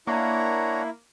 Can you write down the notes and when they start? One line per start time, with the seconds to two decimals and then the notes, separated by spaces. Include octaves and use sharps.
0.07 A#3 D4 E4 C#5 F#5 A#5